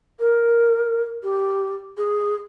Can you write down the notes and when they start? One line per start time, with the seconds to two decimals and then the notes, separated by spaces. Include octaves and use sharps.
0.19 A#4
1.23 G4
1.97 G#4